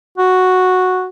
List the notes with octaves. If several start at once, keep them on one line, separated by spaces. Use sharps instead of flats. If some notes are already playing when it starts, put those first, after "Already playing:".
F#4